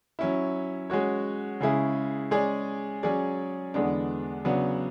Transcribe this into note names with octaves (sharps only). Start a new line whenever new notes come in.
F#3 C#4 E4
G#3 C#4 F#4 C#5
C#3 G#3 C#4 E4 G#4
G#3 C#4 G#4 D5
F#3 C#4 G#4 D5
E2 D3 G#3 B3 D4
C#3 F#3 B3 D4